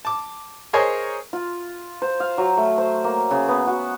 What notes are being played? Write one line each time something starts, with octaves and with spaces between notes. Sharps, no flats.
A5 D6
G#4 A#4 C5 C#5 D#5 G#5
F4
C5
F5
F#3
A3
C5
A#3
C#3
B3
F#4